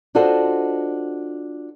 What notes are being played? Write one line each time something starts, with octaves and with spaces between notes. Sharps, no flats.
D4 F4 F#4 A4 C5 D#5